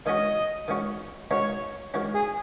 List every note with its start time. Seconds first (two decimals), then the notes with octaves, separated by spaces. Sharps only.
0.06 D#3 G#3 C#4 F#4 D#5
0.68 D#3 G#3 C#4 F#4
1.31 D#3 G#3 C#4 F#4 C#5
1.94 D#3 G#3 C#4 F#4
2.14 G#4